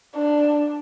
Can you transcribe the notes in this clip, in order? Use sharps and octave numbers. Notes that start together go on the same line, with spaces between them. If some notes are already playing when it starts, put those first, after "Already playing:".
D4